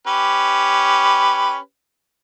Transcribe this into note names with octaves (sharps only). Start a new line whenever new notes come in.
C#4 G4 B4